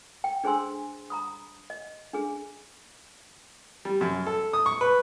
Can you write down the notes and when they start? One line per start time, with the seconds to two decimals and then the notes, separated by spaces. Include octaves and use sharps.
0.24 G5
0.44 D4 G#4 C5 G#5 C6 E6
1.10 A#5 B5 D#6
1.70 D#5
2.13 D4 G#4
3.85 G3
4.01 F#2
4.26 A4
4.53 D#6
4.66 C#6
4.81 B4